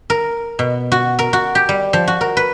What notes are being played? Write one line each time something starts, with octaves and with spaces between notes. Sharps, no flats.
A#4
B2
F#4
A#4
F#4
G4
G3
F3
F#4
A#4
B4